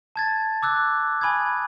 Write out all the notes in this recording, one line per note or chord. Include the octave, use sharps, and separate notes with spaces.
A5 G#6 A6
D6 E6 F#6
G#5 B5 D#6 G#6